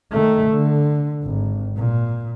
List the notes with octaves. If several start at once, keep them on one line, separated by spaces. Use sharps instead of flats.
D#3 A3
D3
G#1
A#2